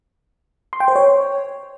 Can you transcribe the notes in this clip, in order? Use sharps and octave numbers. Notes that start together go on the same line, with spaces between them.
C6
G5
C5
C#5